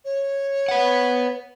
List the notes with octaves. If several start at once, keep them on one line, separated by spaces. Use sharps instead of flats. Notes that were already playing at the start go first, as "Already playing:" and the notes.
C#5
B4 F#5